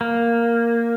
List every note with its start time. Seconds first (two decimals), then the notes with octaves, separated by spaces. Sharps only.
0.01 A#3